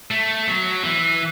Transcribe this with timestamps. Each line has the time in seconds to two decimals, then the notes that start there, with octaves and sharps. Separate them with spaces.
0.11 A3
0.47 F#3
0.84 E3